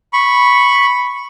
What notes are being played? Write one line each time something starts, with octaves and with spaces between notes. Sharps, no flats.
B5 C#6